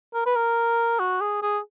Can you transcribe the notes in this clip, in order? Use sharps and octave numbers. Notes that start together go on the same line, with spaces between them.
A#4
B4
A#4
F#4
G#4
G#4